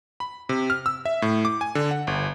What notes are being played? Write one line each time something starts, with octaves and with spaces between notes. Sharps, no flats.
B5
C3
F6
E6
E5
A2
D6
G#5
D3
F#5
G1